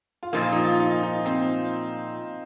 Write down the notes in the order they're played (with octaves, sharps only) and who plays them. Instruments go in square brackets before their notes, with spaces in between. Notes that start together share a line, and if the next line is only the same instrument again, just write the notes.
[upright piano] F4
[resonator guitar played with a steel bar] A#2 F3 A#3 [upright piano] D#4
[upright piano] D#4
F4
D#4
D#4
C4